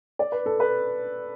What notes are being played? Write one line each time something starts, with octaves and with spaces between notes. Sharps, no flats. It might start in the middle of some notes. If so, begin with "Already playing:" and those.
D5
B4
A4
B4